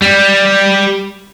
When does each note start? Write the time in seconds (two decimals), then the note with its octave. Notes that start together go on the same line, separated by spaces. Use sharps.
0.02 G3